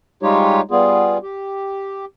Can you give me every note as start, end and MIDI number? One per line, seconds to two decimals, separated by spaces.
0.23 0.61 55
0.23 0.61 56
0.23 0.61 63
0.23 0.61 65
0.23 0.61 67
0.23 0.61 73
0.71 1.18 55
0.71 1.18 59
0.71 1.18 65
0.71 1.18 68
1.23 2.05 67